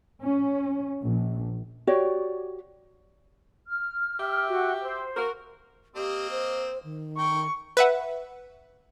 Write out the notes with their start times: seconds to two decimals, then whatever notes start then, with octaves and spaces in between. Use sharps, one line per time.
0.24 C#4
1.03 A#1
1.87 F#4 G4 C#5 D5
3.67 F6
4.20 G4 E5
4.47 F#4
4.82 C5
5.17 F#4 A#4
5.96 A#3 C4 G4 D#5
6.31 C5
6.84 D#3
7.18 A#4 G5 C#6
7.77 B4 E5 F#5